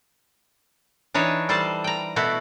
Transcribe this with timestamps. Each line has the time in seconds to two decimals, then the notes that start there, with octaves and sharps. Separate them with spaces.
1.14 E3 D4 D#4 C#5
1.49 G3 A4 C5 A5
1.84 G5 A#5
2.16 B2 A3 E4 F#4